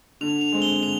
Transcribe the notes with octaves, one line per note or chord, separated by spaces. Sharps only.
D3 F7
F7
G#3 C4
G7
D3 F7